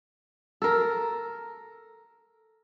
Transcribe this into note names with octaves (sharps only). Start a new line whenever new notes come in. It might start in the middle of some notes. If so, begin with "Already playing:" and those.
A4 A#4